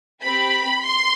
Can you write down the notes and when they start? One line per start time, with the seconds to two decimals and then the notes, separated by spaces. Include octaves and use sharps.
0.23 C4 G4 B5
0.84 C6